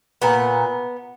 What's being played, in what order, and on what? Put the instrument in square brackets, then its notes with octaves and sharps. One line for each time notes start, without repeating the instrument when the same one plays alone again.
[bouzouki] A#2 B3